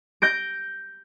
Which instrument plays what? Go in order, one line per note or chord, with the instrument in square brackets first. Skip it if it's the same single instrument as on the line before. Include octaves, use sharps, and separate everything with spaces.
[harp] G6 A#6 D7